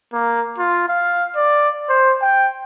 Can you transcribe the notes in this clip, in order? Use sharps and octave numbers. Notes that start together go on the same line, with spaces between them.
A#3
F4
F5
D5
C5
G5